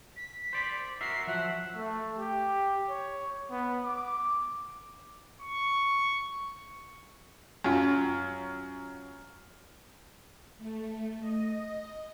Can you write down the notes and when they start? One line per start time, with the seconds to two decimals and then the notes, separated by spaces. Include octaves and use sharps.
0.16 B6
0.53 C5 D5
1.01 F#4 A#4 E5 C7
1.27 F3 F#3 E5 F#5
1.75 A3
2.18 G4
2.89 C#5
3.50 B3
3.84 D6
5.41 C#6
7.64 F#2 F4
10.58 A3
11.20 D#5